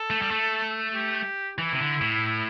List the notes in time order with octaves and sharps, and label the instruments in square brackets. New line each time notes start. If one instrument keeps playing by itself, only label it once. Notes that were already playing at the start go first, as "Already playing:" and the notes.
Already playing: [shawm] A4
[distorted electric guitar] A3
G3
A3
[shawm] G4
[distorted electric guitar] E3 [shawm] E4
[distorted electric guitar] C3
D3
A2